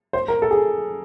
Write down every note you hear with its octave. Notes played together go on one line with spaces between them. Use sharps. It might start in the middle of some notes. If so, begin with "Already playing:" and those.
C5
A#4
A4
G#4